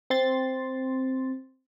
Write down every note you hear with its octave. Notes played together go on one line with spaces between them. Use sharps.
C4 C6 A6